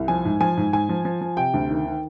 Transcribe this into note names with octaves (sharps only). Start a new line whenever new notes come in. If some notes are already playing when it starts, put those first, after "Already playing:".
Already playing: C2
F3 G#5
G#2
F3 G#5
G#2
G#2 G#5
F3
F3
F3
C3 G5
D2
D#3
D#3